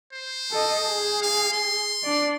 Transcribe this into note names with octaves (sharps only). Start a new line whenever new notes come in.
C5
A4 D#5
G#4
F5
C6
D4 D5